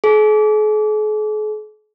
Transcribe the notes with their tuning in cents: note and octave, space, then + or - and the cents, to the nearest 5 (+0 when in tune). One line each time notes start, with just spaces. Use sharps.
G#4 +45